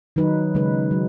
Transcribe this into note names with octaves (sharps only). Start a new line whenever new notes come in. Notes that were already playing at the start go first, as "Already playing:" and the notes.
D#3 F#3 D#4 B4
C#3 G#3 D#4 B4
F#3